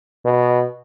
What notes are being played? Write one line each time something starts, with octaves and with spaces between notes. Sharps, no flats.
B2